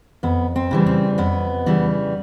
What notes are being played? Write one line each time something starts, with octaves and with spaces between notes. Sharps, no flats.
F2 B3
C4
C#3 E3 G3
C4
F2 B3
C#3 E3 G3